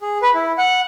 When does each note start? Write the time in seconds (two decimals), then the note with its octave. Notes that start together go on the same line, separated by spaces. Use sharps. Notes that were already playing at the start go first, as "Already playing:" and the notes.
0.01 G#4
0.22 B4
0.34 E4
0.58 F#5